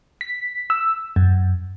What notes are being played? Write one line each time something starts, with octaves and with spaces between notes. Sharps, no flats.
B6
E6
F#2